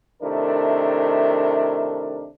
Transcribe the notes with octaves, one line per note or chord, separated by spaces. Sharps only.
C3 D#3 A3 D4 E4 A#4